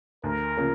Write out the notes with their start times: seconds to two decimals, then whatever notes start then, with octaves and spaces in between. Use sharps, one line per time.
0.24 D2 A#4
0.57 C#3 F3 A#3